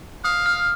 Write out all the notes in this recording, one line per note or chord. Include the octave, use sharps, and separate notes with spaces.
F5 D#6
F6